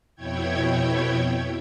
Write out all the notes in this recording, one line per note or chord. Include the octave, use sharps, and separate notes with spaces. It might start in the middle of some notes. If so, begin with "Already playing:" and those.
F2 B2 E4 C#5 G5 G#6